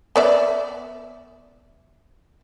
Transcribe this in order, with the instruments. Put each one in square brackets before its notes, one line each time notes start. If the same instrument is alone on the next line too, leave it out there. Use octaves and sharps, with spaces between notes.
[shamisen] B3 D5 E5